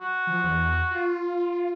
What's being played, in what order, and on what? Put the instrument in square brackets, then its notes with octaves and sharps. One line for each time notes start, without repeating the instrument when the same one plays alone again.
[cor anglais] F#4
[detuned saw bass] F3
E2
F4